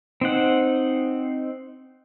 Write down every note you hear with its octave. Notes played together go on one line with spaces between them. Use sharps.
C4 D#4 F#5